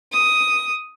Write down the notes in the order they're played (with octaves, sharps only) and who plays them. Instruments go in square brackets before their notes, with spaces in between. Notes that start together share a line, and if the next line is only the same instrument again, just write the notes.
[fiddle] D#6